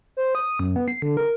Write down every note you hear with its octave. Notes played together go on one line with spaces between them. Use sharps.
C5
D#6
F#2
B3
C7
D3
A#4